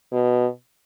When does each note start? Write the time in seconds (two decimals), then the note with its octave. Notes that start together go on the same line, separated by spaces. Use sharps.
0.12 B2